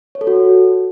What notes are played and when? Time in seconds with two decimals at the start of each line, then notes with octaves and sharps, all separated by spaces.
0.15 C#5
0.21 A4
0.27 F#4